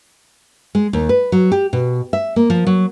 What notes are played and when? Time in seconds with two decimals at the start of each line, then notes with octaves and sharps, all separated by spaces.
0.75 G#3
0.93 D#2
1.09 B4
1.32 F#3
1.52 G4
1.73 B2
2.13 E5
2.36 A#3
2.50 F3
2.67 F#3